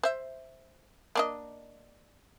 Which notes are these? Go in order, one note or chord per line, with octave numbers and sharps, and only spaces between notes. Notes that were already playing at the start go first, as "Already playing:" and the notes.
C5 E5
A#3 D4 D#5